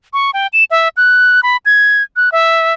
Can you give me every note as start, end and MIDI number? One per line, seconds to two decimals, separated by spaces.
0.13 0.31 85
0.34 0.47 79
0.53 0.64 100
0.71 0.89 76
0.97 1.41 90
1.43 1.57 83
1.66 2.03 92
2.16 2.29 90
2.32 2.74 76